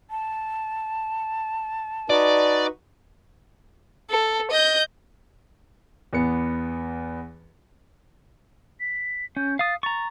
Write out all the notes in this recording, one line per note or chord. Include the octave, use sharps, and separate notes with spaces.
A5
D#4 F#4 B4 D5
A4
D#5 G6
E2 B3 C#7
B6
C#4 G6
F5 D#6 A6
A#5 C#6 A6